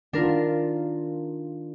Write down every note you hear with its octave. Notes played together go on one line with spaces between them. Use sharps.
D#3 D4 F4 A#4